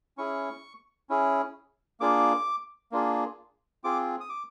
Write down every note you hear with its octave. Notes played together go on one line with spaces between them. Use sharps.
C#4 E4 G#4 C#6
C#4 E4 G#4
A#3 D4 F4 G#4 D6
A#3 D4 F4 G#4
C4 F4 G#4 D6
D#6
D6